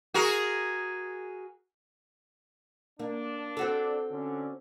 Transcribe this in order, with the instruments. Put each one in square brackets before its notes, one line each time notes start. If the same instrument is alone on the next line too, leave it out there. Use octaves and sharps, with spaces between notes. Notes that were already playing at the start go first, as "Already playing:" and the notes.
[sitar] F#4 G#4 A#4
[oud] A#3 [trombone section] D4
[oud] C4 F#4 A4
[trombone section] D3 C#4 D4